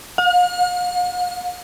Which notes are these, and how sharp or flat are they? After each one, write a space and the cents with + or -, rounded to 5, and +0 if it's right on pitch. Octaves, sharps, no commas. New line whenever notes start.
F5 +45